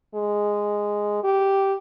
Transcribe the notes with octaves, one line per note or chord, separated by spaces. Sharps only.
G#3
G4